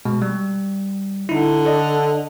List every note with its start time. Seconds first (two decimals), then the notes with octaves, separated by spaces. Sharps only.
0.05 B2 G#3
0.22 G3
1.29 D3 D#4 E4
1.65 A4 D5 D#5